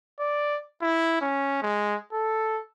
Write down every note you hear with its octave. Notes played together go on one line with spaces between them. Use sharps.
D5
E4
C#4
G#3
A4